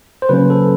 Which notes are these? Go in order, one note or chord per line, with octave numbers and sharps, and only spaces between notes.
C5
C#3 F#3 A#3 C#4 B4
A4